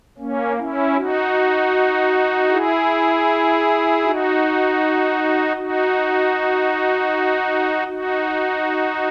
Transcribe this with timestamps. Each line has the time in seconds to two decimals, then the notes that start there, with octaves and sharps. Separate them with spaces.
0.18 A#3 C#4
0.57 C#4 E4
0.96 D#4 F#4
2.49 E4 G#4
4.03 D#4 F#4
5.56 D#4 F#4
7.87 D#4 F#4